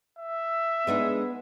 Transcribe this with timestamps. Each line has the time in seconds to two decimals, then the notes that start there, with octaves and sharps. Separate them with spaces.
0.19 E5
0.87 G#3 B3 D4 D#4